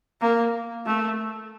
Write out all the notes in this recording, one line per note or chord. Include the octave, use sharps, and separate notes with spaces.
A#3
A3